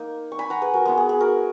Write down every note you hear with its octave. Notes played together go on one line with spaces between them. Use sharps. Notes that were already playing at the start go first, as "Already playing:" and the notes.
Already playing: A#3 D#4
C#6
G#5 B5
F#5 A#5
G#4 B4
F#4 A#4
G#3 B3 E4 G#4
G#4
G#4
F#4 A#4